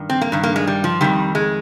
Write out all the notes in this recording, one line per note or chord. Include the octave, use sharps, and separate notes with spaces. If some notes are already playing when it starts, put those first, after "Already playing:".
Already playing: G2 D#3
C4
A#3
G2 D#3
A#3
G#3
G3
F3
F2 C3 D#3 G3
G#3